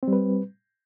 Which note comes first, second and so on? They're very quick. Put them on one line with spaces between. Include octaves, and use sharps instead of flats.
C4 G3 B4